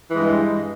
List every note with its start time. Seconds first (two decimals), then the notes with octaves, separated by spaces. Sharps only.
0.11 E3
0.14 G#3
0.17 G2